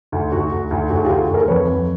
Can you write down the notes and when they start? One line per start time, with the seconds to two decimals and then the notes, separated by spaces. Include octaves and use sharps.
0.12 D2
0.32 D2 F#4
0.52 D2
0.71 D2
0.90 D2 F#4
0.99 G#4
1.05 F4 G4
1.09 D2
1.19 F#4
1.29 D2
1.34 G#4 A#4
1.48 F2 B4 C#5
1.67 F2